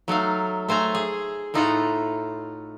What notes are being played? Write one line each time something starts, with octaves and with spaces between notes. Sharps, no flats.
F#3 A3 D#4 F5
A3 C5 G#5 A#5
G#4
A2 A3 D#4 F4 A4 F#5